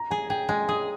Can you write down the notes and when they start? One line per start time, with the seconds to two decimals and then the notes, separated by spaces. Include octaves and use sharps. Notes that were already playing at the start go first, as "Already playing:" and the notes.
Already playing: A#5
0.11 G#4 G#5
0.30 G#4 G5
0.49 G#3 G#5
0.68 G#4 D#6